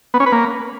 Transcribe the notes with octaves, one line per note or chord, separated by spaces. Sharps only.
B3
C#4
B4
A#3